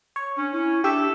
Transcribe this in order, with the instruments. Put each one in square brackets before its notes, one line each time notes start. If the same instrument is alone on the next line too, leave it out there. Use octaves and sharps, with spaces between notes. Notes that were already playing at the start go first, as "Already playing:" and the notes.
[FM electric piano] C#5
[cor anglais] C#4 [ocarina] D4
[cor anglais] C#4 [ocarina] E4
[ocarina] D4 [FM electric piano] G4 E5 [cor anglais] A4